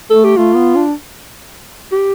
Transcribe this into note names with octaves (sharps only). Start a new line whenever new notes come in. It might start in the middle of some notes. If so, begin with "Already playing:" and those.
A3 A4
G4
A3 F4
B3
D4
G4